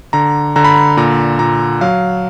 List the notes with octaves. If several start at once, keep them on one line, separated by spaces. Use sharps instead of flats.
D3 A#5
D3 A#5
B5
A#5
A#2 A#5
A#2 A#5
F#3 F5